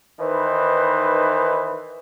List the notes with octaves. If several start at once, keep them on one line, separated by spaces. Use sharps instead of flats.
D#3 E3 D#4 B4 C5